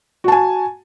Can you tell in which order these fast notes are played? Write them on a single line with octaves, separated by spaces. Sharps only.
F#4 A5 G#5